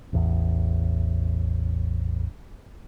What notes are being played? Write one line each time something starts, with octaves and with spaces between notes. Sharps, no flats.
A1 E2